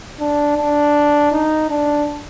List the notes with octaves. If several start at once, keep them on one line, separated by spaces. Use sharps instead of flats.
D4
D4
D#4
D4